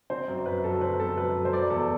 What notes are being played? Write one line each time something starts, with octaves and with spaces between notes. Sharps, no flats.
C4 C5
F#2
F#2 B4
F#3 A4
C4 B4
F#2 A4
F#2 B4
F#3
C5
F#3 D5
E2 A4